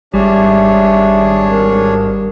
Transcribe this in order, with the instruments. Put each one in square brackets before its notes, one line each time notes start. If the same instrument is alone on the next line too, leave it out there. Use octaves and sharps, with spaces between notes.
[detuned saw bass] G#1 [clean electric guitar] G3 [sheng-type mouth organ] D4 G#4 C#5 [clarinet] E5
[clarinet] A#4